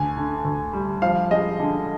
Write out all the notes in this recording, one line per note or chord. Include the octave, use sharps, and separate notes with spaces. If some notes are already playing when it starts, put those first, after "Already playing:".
Already playing: D2 G#5
D3
D2
G3
F3 F5
G#3 D#5
D3